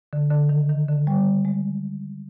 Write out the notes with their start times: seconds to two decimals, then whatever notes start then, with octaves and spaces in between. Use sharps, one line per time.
0.13 D3
0.31 D3
0.49 D#3
0.69 D#3
0.88 D3
1.07 G3
1.45 G#3